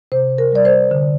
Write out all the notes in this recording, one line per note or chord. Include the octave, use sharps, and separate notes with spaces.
C3 C5
A#4
G3 D5
C5
D3